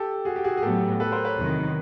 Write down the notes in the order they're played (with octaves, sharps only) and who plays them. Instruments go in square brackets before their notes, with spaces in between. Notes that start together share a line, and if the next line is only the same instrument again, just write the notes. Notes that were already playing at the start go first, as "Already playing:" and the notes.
Already playing: [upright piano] G4 A4
F#4 G#4
G4
F#4 G#4
G#4
[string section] A2 F#3 B3 [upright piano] G4 A4
[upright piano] A4 B4
A#4 C5
B4 C#5
[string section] E2 C3 D#3 F#3